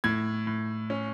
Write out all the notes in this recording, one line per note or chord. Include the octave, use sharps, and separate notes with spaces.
A2 G#6
A2
C#4